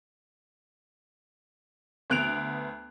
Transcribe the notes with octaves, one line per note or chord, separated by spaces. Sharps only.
D2 B3 F#6 D7 F7